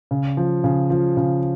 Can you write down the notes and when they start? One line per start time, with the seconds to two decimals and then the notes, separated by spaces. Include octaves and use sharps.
0.11 C#3
0.37 F3
0.64 C#3
0.90 F3
1.17 C#3